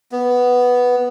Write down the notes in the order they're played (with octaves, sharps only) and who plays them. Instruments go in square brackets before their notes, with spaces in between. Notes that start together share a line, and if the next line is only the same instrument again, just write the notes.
[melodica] B3